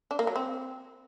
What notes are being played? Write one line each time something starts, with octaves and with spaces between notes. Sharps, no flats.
D4
A#3
F#3
C4